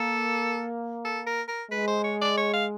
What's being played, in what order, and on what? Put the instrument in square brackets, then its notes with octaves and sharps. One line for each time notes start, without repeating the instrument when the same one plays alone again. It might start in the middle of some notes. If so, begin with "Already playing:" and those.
Already playing: [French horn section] A#3 [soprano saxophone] A4
[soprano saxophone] A4
A#4
A#4
[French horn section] G#3 [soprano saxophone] B4
[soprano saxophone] C5
C#5
D5
C#5
F5